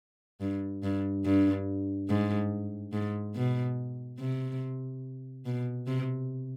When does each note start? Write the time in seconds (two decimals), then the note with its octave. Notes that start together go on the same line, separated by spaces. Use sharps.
0.41 G2
0.83 G2
1.26 G2
2.09 G#2
2.93 G#2
3.36 B2
4.20 C3
5.46 B2
5.87 C3